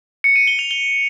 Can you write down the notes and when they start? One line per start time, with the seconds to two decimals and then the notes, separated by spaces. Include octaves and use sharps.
0.24 C#7
0.36 D#7
0.48 G7
0.59 F7
0.71 G7